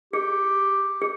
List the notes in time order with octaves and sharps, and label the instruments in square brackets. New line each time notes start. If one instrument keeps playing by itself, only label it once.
[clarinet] G4 [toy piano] G#4
[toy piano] G#4